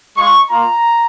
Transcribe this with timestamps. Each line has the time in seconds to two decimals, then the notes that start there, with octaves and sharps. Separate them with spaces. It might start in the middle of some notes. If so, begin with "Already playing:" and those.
0.17 G#3 F4 C#6
0.50 A#3 F4 A#5